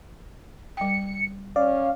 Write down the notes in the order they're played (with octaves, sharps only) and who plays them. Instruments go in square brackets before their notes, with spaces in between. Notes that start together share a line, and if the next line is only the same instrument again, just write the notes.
[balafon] G3 G5 [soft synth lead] C#7
[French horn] C#4 [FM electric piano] D5 [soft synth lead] F5